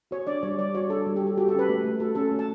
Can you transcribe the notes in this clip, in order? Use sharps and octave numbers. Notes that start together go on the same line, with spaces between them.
F#4 C#5
D4 D5
G3 C#5
G3 D5
F#4 C#5
D4 A4
G3
G4
G3
A4
F#4 G4
C#4 A4
B4
A3
A3
F#4 A4
C#4 A4
A3
A5